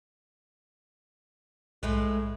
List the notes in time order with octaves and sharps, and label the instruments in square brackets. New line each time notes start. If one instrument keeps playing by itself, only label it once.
[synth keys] B1 [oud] A2 G#3 B4